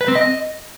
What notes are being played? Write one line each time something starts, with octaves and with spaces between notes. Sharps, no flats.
B4
C4
D#5